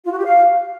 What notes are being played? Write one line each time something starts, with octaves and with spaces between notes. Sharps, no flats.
F4
F#4
G4
F5